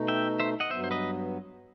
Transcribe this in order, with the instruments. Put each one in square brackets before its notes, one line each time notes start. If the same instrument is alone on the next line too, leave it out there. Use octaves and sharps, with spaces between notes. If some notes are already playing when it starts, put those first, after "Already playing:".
Already playing: [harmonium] B2 A3 D#4
[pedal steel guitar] E5 G5
C5 E5
D#5 F#5
[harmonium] G2 F#3 B3 [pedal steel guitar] C5 E5
[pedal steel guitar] C5
B4 D#5